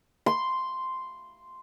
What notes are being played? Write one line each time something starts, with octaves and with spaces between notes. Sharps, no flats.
C6